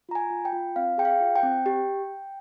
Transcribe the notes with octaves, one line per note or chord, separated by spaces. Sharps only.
F4 A#5
G#5
F4
G5
F4
C4 F5
G#4 G5
F5
F4
G5
C4
G4